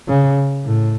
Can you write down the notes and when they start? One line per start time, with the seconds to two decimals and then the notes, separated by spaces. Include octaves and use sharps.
0.09 C#3
0.66 A2